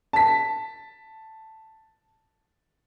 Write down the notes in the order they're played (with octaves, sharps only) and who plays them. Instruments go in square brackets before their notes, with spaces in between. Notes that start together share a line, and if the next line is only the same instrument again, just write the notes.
[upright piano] A5 B6